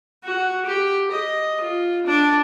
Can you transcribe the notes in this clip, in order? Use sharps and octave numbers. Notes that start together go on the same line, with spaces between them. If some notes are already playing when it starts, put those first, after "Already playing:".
F#4
G4
D#5
F4
D4